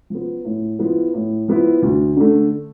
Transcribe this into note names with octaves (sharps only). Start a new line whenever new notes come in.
F3 B3
A2
F3 B3 E4
A2
F3 B3 E4
D2
D3 A3